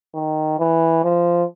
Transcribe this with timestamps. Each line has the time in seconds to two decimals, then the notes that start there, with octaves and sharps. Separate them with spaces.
0.15 D#3
0.59 E3
1.04 F3